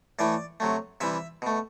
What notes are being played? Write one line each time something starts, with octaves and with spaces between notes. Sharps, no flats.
A2 E3 A3 D5
C3 F#3 A3
C3 E3 G3 E5
B2 A3